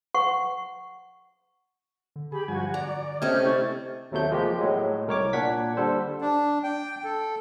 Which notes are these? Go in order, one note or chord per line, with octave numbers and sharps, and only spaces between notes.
F#5 C#6
D3
G4 G#4 B5
G2 F3 F#4 G#5
D5 A#5
C3 A3 C#4 G4 D#5 F6 G6 G#6
E4 D5 C#6
D#2 C3 F#3 A3 G6
F3 G#3 A#3 G4
A2 F#3 G#3
C2 A#4 C#5 D6
A#2 D4 F#5 G#6 B6
D3 G3 A4 C5
D4
G5
A4